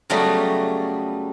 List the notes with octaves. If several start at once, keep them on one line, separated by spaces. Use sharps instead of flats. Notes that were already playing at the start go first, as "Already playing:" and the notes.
C#3 F#3 G3 A3 B3